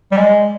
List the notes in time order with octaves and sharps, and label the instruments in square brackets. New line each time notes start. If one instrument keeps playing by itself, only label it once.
[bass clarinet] G3
G#3